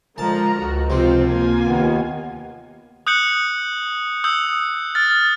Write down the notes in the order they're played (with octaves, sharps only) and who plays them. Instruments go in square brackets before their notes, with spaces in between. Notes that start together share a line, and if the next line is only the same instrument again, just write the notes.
[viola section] D3 F3 A#5 [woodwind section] G#3 [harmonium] A#4 [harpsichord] A5
[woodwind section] C#2 [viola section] F#4
[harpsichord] C3 [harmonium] F3 C5 [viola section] C4 F4
[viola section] A#3 F4 G#5
[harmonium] D#2 D#3 B3
[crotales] D#6 F#6 G6 C#7 F#7
D#6 E6 G6
F6 A6